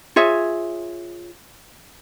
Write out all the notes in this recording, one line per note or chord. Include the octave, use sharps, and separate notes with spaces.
F4 G#4 C#5 E5